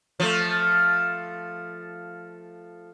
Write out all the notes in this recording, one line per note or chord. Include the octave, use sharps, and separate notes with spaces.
F3 A3